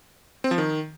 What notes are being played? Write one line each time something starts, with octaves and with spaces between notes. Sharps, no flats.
C4
F3
D#3